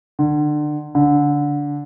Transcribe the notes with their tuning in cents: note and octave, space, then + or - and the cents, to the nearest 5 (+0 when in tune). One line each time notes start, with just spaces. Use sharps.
D3 +30
D3 -15